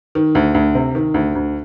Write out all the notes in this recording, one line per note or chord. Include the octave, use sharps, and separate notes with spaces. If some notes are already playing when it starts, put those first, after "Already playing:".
D#3
D2
D2
C3
D#3
D2
D2